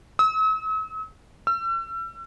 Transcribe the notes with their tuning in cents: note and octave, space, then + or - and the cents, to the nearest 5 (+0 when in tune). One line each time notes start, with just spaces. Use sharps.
E6 -45
E6 +40